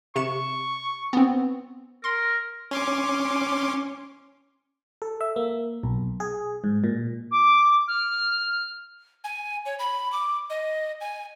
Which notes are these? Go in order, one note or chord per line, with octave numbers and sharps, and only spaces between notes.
C3 C#6 C#7 E7
B3 C4
A#4 C6
C#4 C6 D6
A4
E5
A#3
B1
G#4
G#2
A#2
D6
F6
G#5
C#5
B5
D6
D#5
G#5